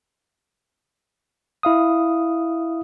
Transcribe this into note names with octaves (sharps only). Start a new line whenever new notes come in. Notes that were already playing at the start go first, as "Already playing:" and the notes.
E4 F5 D#6